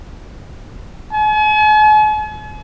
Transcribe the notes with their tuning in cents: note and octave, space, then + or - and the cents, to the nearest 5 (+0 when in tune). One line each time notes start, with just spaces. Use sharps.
G#5 +45